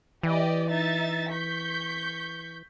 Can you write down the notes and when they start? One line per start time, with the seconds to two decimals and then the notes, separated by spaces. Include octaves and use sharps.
0.23 E3 G4 D5 D#5
0.68 D#4 E5 A6
1.31 C#6 G6 B6